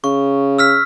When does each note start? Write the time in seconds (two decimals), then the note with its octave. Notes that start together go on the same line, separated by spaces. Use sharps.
0.04 C#3 C#6
0.59 E6 F6 B6